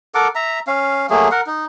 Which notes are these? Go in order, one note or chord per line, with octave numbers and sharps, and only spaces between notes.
A4 A#4 F#5 D6
E5 A#5
C#4 F5
F#3 A3 A#3 G#4
A#4 F#5
D#4